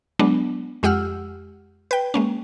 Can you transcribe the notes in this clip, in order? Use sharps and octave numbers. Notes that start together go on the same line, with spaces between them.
F#3 G#3 B3 D4
F2 G#3 G4 F#5 E6 F6
B4 G5
G#3 A#3 C#4